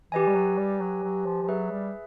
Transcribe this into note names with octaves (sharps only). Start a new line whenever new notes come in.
E3 G4 B4 D#5 G#5
G3
F#3
G3
F#3
F#3
F3
F3
F#3 G#4 B4 E5
G3